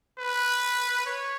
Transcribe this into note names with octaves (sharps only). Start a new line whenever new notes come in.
B4
C#5